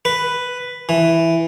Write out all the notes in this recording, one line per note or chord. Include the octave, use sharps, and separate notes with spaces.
B4
E3